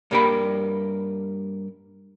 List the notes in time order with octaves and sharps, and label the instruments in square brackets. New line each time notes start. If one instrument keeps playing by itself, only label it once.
[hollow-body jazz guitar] G2 G3 A#3 G4 A#4 B5